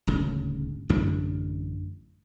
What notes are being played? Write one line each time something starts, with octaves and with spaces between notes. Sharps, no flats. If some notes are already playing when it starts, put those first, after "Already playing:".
D#1 G#1 D2 C#3
A1 F#2 D3 D4